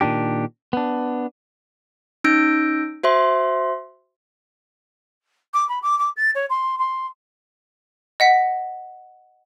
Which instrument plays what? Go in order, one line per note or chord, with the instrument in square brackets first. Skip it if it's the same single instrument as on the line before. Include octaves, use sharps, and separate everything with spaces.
[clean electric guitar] A#2 D#3 D4 G4
B3 D4
[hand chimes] C#4 D#4 E6 G6 A#6 D7
F#4 C5 E5 C6
[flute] D6
B5
D6
D6
A6
C#5
C6
C6
[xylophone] D#5 F#5 B6